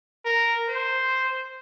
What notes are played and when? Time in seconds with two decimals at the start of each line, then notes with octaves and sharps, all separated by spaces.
0.25 A#4
0.69 C5